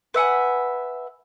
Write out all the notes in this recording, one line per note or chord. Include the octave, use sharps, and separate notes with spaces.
B4 E5 F#5 G#5